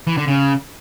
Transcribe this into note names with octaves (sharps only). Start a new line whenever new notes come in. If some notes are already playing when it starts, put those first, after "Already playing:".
E3
D3
C#3